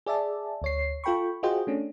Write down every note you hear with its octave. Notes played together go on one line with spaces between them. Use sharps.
G#4 D5 E5 A5
D2 C#5 C7
F4 A4 G5 B5 C#6
F4 F#4 G#4 C5 D#5 G5
A3 C#4 D4